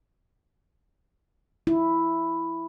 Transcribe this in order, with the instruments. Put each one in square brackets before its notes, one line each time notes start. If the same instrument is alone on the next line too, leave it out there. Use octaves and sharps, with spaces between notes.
[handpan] E4